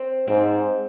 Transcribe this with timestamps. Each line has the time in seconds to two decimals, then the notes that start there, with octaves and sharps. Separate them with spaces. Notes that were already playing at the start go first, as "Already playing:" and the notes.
Already playing: C4
0.28 G#2 C4